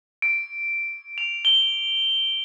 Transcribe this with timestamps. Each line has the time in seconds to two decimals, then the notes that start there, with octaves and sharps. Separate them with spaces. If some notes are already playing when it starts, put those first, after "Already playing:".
0.22 D7
1.18 F7
1.45 G7